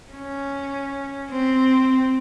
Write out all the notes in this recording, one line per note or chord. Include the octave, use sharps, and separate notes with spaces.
C#4
C4